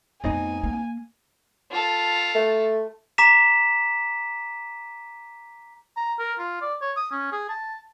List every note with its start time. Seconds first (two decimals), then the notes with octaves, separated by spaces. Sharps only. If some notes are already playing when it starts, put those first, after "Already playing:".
0.24 F2 A2 B3 C4 D#4 G#5
0.64 A#3
1.72 F4 A4
2.35 A3
3.18 A#5 D6 B6 E7
5.97 A#5
6.19 A#4
6.39 F4
6.62 D5
6.81 C#5
6.97 D#6
7.12 C#4
7.32 G#4
7.49 A5